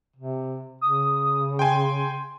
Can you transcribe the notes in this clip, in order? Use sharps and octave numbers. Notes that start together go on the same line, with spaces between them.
C3
C#3 D#6
G5 G#5 C6